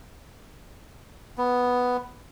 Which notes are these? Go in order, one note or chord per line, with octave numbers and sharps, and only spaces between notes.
B3